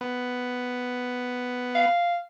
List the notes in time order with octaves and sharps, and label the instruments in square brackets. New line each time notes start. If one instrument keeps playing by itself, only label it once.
[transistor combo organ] B3
[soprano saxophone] F5